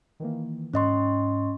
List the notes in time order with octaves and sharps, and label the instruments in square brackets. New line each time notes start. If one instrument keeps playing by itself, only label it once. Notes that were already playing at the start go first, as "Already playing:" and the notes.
[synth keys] D#3 E3 A#3
[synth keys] G#2 C#6 [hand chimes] C#4 D#5 C6